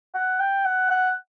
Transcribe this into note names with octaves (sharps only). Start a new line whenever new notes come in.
F#5
G5
F#5
F#5